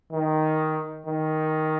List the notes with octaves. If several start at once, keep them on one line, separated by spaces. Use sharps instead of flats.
D#3
D#3